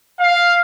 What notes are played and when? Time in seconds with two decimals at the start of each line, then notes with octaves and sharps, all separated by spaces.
0.20 F5